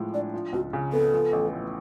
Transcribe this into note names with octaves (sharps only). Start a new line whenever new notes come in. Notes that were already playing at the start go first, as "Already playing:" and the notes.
Already playing: A2 F3 G#3
D4 D5
F3
C#2 F#4
C#3
B3 A4
F3
A1
A2